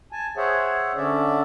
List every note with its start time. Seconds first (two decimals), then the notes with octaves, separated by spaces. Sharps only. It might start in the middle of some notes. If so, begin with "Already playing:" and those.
0.12 G#5 A5
0.37 G#4 C5 C#5 E5 F#5
0.96 D3 C#4 D5 E5